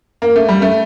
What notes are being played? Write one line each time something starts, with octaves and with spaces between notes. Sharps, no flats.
A#3
A3
G3
A3